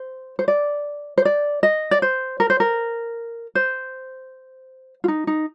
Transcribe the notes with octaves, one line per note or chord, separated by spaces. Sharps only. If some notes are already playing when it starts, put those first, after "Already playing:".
Already playing: C5
C5
D5
C5
D5
D#5
D5
C5
A#4
C5
A#4
C5
F4
D#4
D#4